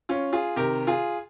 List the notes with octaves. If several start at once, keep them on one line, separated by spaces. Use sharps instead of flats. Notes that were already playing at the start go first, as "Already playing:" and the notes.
C#4 F4
F4 G#4
C3 D#3 G4 A#4
F4 G#4